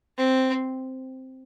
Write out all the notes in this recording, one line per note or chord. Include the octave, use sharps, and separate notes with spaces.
C4